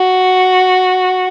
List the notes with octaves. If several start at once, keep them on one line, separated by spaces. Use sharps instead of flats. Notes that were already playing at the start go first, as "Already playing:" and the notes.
Already playing: F#4